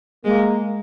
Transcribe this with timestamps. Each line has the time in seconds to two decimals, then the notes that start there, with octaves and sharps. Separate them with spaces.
0.24 G#3 A#3